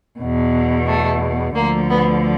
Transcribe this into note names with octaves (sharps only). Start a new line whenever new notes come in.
E2 B2
A3
D2 D3 F3 A#3
B3